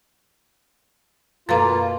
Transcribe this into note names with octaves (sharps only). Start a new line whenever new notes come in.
F#2 B2 A#3 F4 A4 A#5